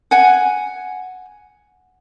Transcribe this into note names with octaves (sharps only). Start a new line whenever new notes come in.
F#5 G#5